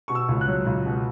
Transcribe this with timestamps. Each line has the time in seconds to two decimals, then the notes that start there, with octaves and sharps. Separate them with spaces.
0.08 B2 C#6
0.15 E6
0.29 C#2
0.41 F#6
0.47 F#3
0.67 C#2
0.86 B2